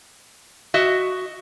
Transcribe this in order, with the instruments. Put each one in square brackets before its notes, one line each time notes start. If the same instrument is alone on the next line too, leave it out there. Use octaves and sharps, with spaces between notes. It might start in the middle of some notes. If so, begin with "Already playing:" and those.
[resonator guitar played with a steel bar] F#4 D#5 E5